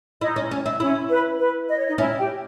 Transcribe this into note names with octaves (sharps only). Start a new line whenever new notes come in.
D#4 E4 D#5
C#4
C#4
E4
C#4 E4 C#5
B4
B4
D#5
C#5
D#4 D#5
C#4 E4 E5
G4 G5